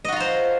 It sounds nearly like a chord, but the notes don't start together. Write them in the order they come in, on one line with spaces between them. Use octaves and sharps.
D#5 F#4 F4 A#5 C5